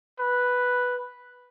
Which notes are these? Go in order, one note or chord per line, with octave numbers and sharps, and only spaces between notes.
B4